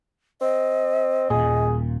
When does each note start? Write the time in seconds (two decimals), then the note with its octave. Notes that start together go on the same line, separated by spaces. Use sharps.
0.41 C4 D#5
1.30 D#1 A#2 G#4